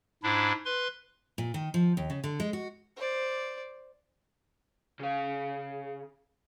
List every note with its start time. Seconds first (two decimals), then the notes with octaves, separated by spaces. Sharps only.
0.23 G#2 D4 E4
0.65 B4 C6
1.38 A#2
1.54 D#3
1.74 F3
1.97 D#2
2.10 C#3
2.24 D3
2.40 G#3
2.53 F#4
2.96 C5 D5
4.99 C#3 F5